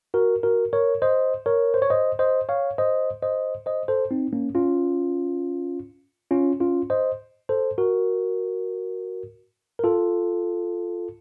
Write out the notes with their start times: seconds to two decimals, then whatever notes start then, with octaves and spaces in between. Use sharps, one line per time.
0.14 F#4 A#4
0.43 F#4 A#4
0.73 A#4 C#5
1.02 C5 D#5
1.46 A#4 C#5
1.74 C5
1.82 C#5
1.90 C5 D#5
2.19 C5 D#5
2.49 C#5 F5
2.78 C5 D#5
3.22 C5 D#5
3.66 C5 D#5
3.88 A4 C5
4.11 C4 D#4
4.33 A#3 C#4
4.55 C#4 F4
6.31 C#4 F4
6.60 C#4 F4
6.90 C5 D#5
7.49 A4 C5
7.78 F#4 A#4
9.79 A#4
9.84 F4 A4